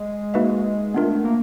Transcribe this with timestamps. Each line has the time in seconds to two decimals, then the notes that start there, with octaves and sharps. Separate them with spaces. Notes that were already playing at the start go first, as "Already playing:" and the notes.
Already playing: G#3
0.34 A#3 D#4 F#4 B4 E5
0.94 A3 B3 D4 F4 A#4
1.25 A#3